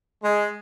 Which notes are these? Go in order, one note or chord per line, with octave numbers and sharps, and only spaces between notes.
G#3